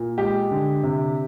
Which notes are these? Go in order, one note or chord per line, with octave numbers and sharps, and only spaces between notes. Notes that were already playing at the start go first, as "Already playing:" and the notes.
Already playing: A#2
G#3 G4
D3
C3